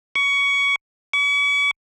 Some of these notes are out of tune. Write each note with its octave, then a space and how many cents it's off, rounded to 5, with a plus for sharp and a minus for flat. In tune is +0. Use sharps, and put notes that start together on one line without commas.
C#6 +20
C#6 +45